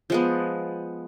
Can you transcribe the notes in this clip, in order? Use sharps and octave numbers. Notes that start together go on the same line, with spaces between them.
F3 G#3 B3